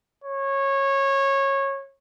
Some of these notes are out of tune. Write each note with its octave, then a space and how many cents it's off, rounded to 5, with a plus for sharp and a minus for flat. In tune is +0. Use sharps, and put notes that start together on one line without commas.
C#5 -20